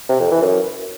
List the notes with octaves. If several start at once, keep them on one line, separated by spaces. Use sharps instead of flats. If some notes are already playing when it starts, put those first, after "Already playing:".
C3
F2
E3
F#2